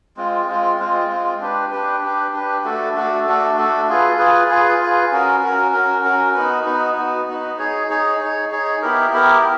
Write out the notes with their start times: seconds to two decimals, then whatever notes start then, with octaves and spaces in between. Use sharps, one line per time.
0.17 G#3 C4 F4
0.48 G#3 C4 F4
0.79 G#3 C4 F4
1.10 G#3 C4 F4
1.41 D4 G4 B4
1.71 D4 G4 B4
2.02 D4 G4 B4
2.33 D4 G4 B4
2.64 A3 D4 F#4 A4
2.95 A3 D4 F#4 A4
3.26 A3 D4 F#4 A4
3.57 A3 D4 F#4 A4
3.88 F4 G#4 B4
4.19 F4 G#4 B4
4.50 F4 G#4 B4
4.80 F4 G#4 B4
5.11 C#4 F#4 A#4
5.43 C#4 F#4 A#4
5.73 C#4 F#4 A#4
6.04 C#4 F#4 A#4
6.35 B3 D#4 F#4 B4
6.66 B3 D#4 F#4 B4
6.97 B3 D#4 F#4 B4
7.28 B3 D#4 F#4 B4
7.59 D#4 G#4 C#5
7.90 D#4 G#4 C#5
8.20 D#4 G#4 C#5
8.51 D#4 G#4 C#5
8.82 B3 E4 G4 A#4
9.13 B3 E4 G4 A#4